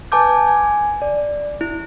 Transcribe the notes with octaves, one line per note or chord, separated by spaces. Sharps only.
B4 G#5 A5 D6 G6
G#5
D5
E4